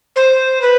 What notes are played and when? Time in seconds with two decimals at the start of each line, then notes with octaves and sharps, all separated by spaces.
0.16 C5
0.62 B4